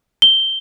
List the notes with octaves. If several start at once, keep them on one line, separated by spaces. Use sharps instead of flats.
G7